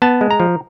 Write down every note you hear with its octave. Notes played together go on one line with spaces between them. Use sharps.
B3 A5
G#3
A#5
F3